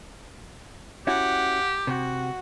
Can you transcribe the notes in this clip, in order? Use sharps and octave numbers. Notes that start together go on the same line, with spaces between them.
C#4 E4 F#4 G4 F#5
C3 F#4